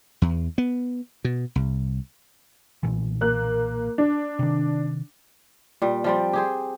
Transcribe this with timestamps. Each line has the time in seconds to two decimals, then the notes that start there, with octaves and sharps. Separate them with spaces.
0.22 E2
0.58 B3
1.24 B2
1.55 C2
2.83 B1 A#2 E3
3.21 A#3 F#6
3.98 D4
4.39 C3 D#3
5.82 A#2 G3
6.04 F3 G3 C4
6.33 G4 G#4 C5